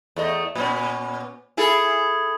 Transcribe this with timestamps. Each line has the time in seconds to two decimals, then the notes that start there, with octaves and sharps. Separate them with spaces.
0.16 E2 A3 D#5
0.55 A#2 B3 C#4
1.57 E4 G#4 A4